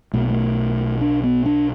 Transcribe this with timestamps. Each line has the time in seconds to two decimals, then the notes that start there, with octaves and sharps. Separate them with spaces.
0.13 B1 B2 A3
0.22 B3
0.30 A3
1.01 D4
1.24 B3
1.46 D4